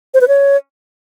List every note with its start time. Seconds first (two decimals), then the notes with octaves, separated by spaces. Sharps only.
0.14 C5
0.21 B4
0.28 C#5